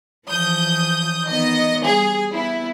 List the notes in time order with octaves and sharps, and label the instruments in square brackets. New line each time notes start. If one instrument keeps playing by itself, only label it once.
[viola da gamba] E3 F3 [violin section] D#6 G6
[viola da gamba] D#3 B3 [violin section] D#5
[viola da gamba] G3 [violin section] G#4
[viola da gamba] B3 [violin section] E4